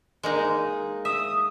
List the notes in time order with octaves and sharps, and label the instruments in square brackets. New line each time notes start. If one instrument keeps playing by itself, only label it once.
[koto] G#3 A#3 D#4
[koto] E5 [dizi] D#6